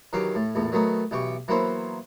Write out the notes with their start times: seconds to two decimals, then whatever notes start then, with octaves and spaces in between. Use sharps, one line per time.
0.13 D#3 E3 F#3 G4 F5 D6
0.35 A2
0.55 A#1 E2 A2
0.72 D#3 F#3 A3 B3 D#4
1.11 B1 E3 G4 G5 C#6
1.48 E3 F#3 A#3 B3 E4 C5